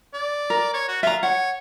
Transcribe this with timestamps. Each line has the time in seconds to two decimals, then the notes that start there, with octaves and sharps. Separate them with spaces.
0.14 D5
0.50 A#4
0.74 C#5
0.88 F#4
1.03 F4 E5 A#5
1.23 C#5 F#5